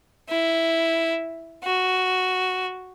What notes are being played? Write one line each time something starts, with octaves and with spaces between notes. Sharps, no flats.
E4
F#4